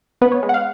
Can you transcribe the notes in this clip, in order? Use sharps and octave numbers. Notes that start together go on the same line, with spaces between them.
B3 B4
C#5
G#3
F#5
F5